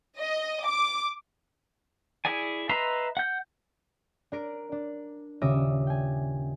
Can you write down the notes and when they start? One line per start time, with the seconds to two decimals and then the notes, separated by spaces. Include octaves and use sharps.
0.19 D#5
0.66 D6
2.25 E4 G#4 D5 G#5
2.69 B4 D#5 E5 A#5 C6
3.17 F#5 G6
4.32 D4 A#4 D7
4.72 D4
5.42 D#1 C#3 E5 D6 D#6 A#6
5.87 G5 G#5